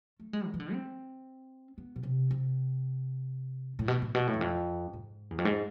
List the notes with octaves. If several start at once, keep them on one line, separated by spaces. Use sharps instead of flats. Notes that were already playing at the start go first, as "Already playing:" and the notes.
A3
G#3
D3
E3
D3
C4
B3
B2
C3
C3
A2
B2
A2
B2
A2
E2
F2
G#2
E2
F2
G#2